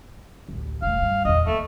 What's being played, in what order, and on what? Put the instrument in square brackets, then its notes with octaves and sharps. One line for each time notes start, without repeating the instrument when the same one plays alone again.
[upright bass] A1 D2
[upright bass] E1 A3 [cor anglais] F5
[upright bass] G2
[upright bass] A#1 E2 [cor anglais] D#5
[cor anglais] A3 [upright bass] A#3